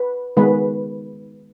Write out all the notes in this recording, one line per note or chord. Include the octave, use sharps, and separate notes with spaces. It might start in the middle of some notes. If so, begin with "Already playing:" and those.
Already playing: B4
D#3 G#3 B3 B4